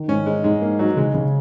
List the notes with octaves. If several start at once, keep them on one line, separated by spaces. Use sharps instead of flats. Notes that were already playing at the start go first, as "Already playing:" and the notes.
Already playing: D#3
G#2 C#4
G#3 D#4
G#2 G#3
A#3 D#4
F#3 D#4
C#3 G#3
C#3